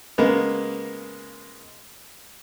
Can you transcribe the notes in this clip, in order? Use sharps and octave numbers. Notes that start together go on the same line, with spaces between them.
C#3 G#3 A#3 B3